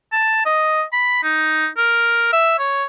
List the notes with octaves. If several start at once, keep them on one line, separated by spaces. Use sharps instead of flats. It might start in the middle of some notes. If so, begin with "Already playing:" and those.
A5
D#5
B5
D#4
A#4
E5
C#5